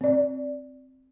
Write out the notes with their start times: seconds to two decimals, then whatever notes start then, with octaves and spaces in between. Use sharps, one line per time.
0.01 C4 D5